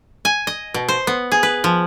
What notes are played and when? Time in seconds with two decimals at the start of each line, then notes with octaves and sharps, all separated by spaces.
0.25 G#5
0.47 D#5
0.74 B2
0.88 C5
1.07 B3
1.32 G#4
1.43 B4
1.64 F3